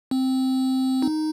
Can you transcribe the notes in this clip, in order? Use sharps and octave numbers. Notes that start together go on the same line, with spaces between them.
C4
D#4